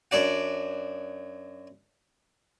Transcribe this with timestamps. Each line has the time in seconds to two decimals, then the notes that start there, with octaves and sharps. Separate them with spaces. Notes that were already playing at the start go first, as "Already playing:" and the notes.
0.11 F#2 D4 D5 F#5